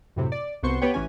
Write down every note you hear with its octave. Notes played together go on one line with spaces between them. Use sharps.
F#2 A2 C3
D5
C2 B3 F#4 C5 C6 C#6
B3 G4 B4 C#5 G5
A1 E3 C#4 G#5